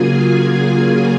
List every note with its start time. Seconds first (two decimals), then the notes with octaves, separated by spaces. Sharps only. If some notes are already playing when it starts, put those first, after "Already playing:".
Already playing: C#3 F#3 A#3 F4 G#4 G#5
0.21 G#4 G#5